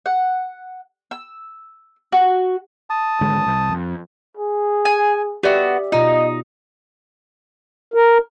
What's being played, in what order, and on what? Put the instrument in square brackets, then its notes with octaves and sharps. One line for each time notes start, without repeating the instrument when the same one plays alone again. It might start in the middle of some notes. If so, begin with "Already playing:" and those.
[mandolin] F#5
E6
F#4
[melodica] A5 D#6
[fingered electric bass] G#1 D3 G#3
C2
F2
[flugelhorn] G#4
[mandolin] G#5
[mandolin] B3 F#4 [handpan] G4 D5 E5
[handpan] B2 F4 [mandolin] D#4 [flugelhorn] D#5
[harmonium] A#4